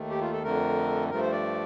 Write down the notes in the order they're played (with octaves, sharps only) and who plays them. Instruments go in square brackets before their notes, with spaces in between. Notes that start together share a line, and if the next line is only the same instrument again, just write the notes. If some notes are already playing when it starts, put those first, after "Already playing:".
Already playing: [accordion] D#2 D#3 A3
G4
F4
A4
F2 D3 A3 A#4
G2 F3 A3 A#4
C5
D5